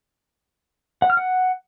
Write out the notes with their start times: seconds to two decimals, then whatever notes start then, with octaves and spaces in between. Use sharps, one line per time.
1.02 F#5
1.10 F6
1.17 F#5